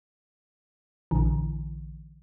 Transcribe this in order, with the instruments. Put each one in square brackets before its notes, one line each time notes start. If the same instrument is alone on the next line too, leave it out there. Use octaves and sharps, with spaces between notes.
[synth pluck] A#1 D3 E3